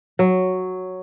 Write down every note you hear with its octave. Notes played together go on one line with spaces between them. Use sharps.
F#3